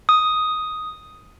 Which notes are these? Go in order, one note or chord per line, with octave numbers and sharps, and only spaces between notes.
D#6